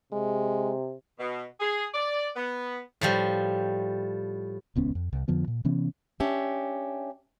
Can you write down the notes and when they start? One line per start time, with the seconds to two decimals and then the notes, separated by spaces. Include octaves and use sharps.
0.13 C3 G#3
1.19 B2
1.60 G#4
1.94 D5
2.36 B3
3.01 A2 F3 G3
4.76 D#1 C#2 B3 C#4
4.95 F2
5.13 C2
5.28 F2 D3 F3 B3
5.48 A#2
5.65 C3 E3 B3 C#4
6.20 C#4 D4 G4 E5